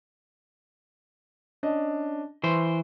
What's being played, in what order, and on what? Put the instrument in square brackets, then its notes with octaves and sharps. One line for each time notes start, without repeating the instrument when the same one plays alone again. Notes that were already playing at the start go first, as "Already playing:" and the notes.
[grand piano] C#4 D4 D#5
[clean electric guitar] E3 C5 [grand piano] B4 C6 C#6